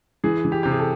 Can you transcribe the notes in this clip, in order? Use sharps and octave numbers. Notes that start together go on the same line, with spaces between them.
E3 G#4
E3
G4
C3 G4
G#4
A4